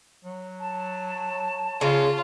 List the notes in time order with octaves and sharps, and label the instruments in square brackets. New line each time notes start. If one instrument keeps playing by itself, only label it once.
[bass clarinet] F#3
[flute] A5
[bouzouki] C#3 [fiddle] F4